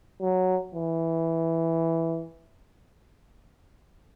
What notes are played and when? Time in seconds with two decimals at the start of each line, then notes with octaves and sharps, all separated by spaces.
0.21 F#3
0.75 E3